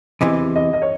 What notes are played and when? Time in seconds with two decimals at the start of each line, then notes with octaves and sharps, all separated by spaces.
0.21 E2 C3 E3 D#5
0.56 D#5
0.73 D#5
0.82 C#5